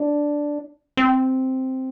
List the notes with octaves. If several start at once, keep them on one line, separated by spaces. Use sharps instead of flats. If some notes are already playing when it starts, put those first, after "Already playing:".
Already playing: D4
C4